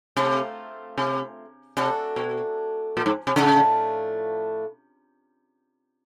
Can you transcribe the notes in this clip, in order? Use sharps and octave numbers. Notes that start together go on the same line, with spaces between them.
C3 A3 C4 F4
C3
C3 A3 D4 F#4 A4
B2
A#2
G#2
C3
A2 C#3 F3 A3 D4